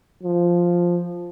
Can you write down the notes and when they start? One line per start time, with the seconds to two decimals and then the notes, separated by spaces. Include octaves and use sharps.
0.23 F3